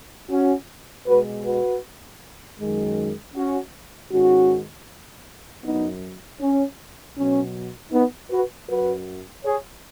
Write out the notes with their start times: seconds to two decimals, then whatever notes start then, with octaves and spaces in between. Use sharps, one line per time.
0.30 C#4 F#4
1.06 B2 G#3 F#4 B4
1.44 F#4 B4
2.59 F#2 D#3 G#3
3.34 C#4 F#4
4.11 G#2 D#3 G#3 C#4 F#4
5.63 F#2 F#3 B3 D#4
6.41 C#4
7.16 B2 F#3 C#4
7.92 B3 D#4
8.30 F#4 B4
8.68 F#2 F#3 F#4 B4
9.45 G#4 C#5